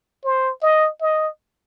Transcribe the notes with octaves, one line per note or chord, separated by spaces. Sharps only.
C5
D#5
D#5